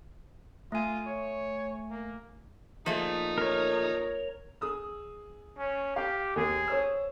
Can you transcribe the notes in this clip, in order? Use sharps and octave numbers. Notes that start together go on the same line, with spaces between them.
A3 F4 G#5
C#5
A#3
A#2 F3 A3 D#4 G#4
A#4 C#5
G#4 D#6 E6
C#4
G4 F5
D#2 G#4
C5 C#5 E6